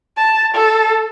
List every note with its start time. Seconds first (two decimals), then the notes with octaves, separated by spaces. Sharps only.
0.17 A5
0.54 A4